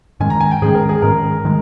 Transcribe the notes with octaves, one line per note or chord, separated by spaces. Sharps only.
G#2 D#3 G#3 C#4 G#5
A#5
G#5
G5
G#2 D#3 G#3 C#4 G#4
A#4
G#4
G#2 D#3 G#3 C#4 A#4
D#3 G#3